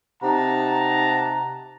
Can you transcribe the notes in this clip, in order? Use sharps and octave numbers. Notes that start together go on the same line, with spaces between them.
C3 D#4 F#5 A5 A#5